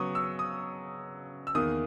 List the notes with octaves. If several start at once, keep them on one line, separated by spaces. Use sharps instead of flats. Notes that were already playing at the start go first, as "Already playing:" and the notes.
Already playing: C#3 F#3 B3 C#6 D#6
E6
D#6
E6
E2 D#3 A#3 D#6